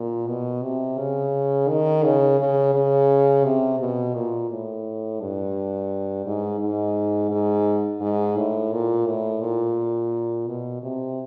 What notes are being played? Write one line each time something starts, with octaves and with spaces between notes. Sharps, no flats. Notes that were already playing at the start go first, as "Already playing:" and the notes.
Already playing: A#2
B2
C3
C#3
D#3
C#3
C#3
C#3
C3
B2
A#2
A2
G2
G#2
G#2
G#2
G#2
A2
A#2
A2
A#2
B2
C3